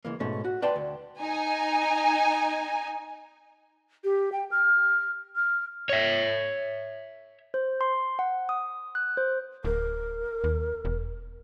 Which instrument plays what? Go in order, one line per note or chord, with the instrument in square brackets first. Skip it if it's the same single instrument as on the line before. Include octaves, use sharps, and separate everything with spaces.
[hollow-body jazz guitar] C#2 E3 A#3
G#2 B2 A3 C#4
F#4
B4 D5 G5 A5 C6
D2
[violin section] D#4 G#5
[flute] G4
G5
F6
F6
[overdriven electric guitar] C#5 E5
[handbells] C5
C6
F#5
D#6
F#6
C5
[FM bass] D1 [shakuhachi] A#4
[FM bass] D#2
E1